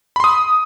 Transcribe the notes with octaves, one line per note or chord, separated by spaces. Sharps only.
B5 C6 D#6